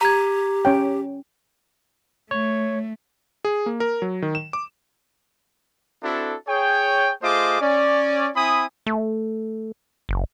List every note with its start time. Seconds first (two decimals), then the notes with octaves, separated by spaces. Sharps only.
0.01 G4 A#5 G#6
0.65 C#4 C#5 G5
2.31 A3 C#5
3.45 G#4
3.66 A#3
3.80 A#4
4.02 F#3
4.22 D#3
4.35 E7
4.53 D6
6.03 C4 D4 E4 F#4 A4
6.47 G#4 C#5 G5
7.22 A3 F4 G#4 C5 D#5 D6
7.61 C#4 D5
8.35 C4 E4 G#5 B5 D#6
8.86 A3
10.09 F#1